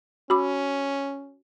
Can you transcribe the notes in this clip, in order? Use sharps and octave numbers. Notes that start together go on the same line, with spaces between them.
C#4 F#4 B5 D6